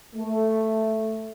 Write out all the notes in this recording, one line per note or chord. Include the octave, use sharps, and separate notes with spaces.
A3